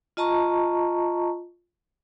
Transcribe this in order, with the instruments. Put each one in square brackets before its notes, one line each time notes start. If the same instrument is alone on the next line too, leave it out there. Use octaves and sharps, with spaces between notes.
[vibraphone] F4 D#5 A5 A#5 C#6